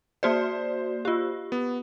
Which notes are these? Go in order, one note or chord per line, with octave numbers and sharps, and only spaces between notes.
A#3 F#4 C5 D5
F4 G4
B3